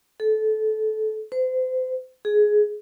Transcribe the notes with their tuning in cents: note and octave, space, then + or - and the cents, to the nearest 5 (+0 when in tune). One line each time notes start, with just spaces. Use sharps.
A4 -20
C5 -35
G#4 +15